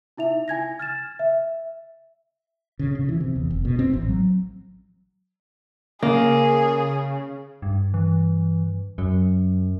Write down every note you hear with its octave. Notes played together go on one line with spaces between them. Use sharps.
D#4 E4 E5 F7
E4 G#5 G#6 A#6
F6 A6 E7
E5
C#3
C#3
E3
C3
E2
F1
B2
C4
A1
F#3
C#3 A#3 G#4
G2
E3
F#2 F#3